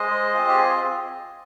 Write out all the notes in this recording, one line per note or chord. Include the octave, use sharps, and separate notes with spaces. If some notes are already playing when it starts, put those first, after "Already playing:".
Already playing: G#3 C5 D#5
C4 F4
G4
G#4